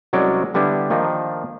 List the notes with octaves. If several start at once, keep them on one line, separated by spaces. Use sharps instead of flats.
C2 F#3 G#3 C#4 D5
D3 G3 B3 D4 E4
D#3 F3 A#3 D4 D#4